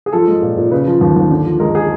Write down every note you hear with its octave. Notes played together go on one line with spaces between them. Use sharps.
G#4
F3 A4
G#3
A#2
A#2
C#3 B4
F3
D#2
D#2
D3
F3
G#3 A#4
G#4